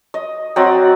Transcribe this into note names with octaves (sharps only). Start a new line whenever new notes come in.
D#5
F#3 C4 D5 D#5